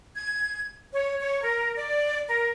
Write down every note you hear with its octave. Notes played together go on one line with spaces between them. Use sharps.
G#6
C#5
C#5
A#4
D5
A#4